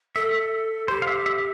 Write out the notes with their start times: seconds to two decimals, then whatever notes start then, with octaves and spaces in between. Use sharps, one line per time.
0.15 A4 E5
0.88 G4 C5
1.02 F5
1.07 E5
1.26 E5